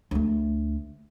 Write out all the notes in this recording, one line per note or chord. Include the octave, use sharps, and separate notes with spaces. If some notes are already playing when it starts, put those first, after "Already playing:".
D2 A3